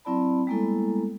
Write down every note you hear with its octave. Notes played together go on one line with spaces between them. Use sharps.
F#3 C4 E4 D5 A5 B5
G3 G#3 A#3 B3 E4 A4